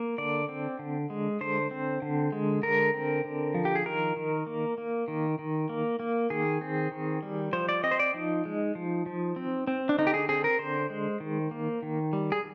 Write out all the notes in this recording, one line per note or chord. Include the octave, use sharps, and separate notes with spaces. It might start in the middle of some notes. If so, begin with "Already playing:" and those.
Already playing: A#3
D3 D5
C4
D3
G#3
D3 C5
C4
D3
G#3
D3 A#4
C4
D3
F3
G4
G#4
D#3 A#4
D#3
A#3
A#3
D#3
D#3
A#3
A#3
D#3 G#4
C4
D#3
G3
F3 C5
D5
C4 D#5
C5
D5
F3 D#4
G#3
F3
F3
C4
C4
D4
D3 D#4
G4
G#4
C4 G#4
A#4
D3 C5
G#3
D#3
A#3
D#3
G3
G#4